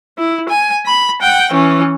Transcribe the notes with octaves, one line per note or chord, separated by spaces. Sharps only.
E4
G#5
B5
F#5 G5
E3 C#4